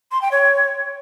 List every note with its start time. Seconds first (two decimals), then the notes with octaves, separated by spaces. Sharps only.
0.12 C6
0.22 G5
0.32 C#5